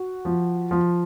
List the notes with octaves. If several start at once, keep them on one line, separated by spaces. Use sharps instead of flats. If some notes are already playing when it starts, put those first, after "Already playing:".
Already playing: F#4
F3
F3